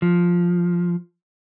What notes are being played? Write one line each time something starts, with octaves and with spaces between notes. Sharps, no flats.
F3